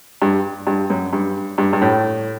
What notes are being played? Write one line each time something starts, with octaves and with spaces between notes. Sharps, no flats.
G2
G2
F#2
G2
G2
G2
A2